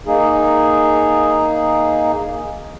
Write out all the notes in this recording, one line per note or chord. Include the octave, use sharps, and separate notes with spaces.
A#3 D#4 G#4